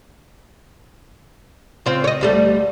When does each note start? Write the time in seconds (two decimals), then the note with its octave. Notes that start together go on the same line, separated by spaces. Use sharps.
1.86 C#3 C4 F4
2.04 C#5 D#5
2.21 D2 G3 A3